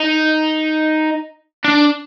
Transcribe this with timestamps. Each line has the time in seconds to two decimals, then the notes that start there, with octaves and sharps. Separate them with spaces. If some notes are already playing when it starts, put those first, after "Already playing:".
Already playing: D#4
1.65 D4